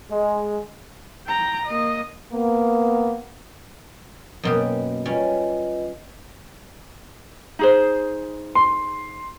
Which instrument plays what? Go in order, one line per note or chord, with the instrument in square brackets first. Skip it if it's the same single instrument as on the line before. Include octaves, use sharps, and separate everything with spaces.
[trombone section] G#3
[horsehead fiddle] G5 A#5
A#3 D#5
[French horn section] A#3 B3
[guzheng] F#2 B2 G4 [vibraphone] A#3 B3 D#5
[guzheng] G3 C#4 [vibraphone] F4 B4 D#5
[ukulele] D#4 G#4 C5
[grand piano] C6